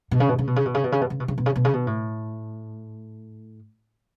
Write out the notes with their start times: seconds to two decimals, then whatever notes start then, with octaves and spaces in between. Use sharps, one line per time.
0.11 B2
0.20 C#3
0.29 B2
0.39 C#3
0.47 B2
0.56 C#3
0.65 B2
0.74 C#3
0.84 B2
0.92 C#3
1.01 B2
1.10 C#3
1.20 B2
1.28 C#3
1.38 B2
1.46 C#3
1.56 B2
1.65 C#3
1.73 B2
1.87 A2